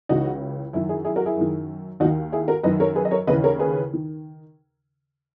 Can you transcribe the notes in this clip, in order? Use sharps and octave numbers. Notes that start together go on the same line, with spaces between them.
C#2 C#3 E3 D#4 F#4
F#2 D#3 E4
E4 G#4
E4 G#4
F#4 A#4
E4 G#4
F#2 D#3
D#2 D#3 D#4 F#4
E4 G#4
F#4 A#4
F#2 D#3 B4 D#5
A#4 C#5
G#4 B4
D#5
A#4 C#5
D#2 C#3 E3 B4 D#5
A#4 C#5
G#4 B4
D#3